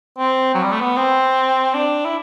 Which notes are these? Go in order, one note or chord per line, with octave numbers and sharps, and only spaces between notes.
C4
F#3
G3
A3
B3
C4
D4
E4